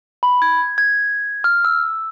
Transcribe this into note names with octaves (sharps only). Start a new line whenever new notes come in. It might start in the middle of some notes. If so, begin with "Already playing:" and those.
B5
G#6
G#6
F6
E6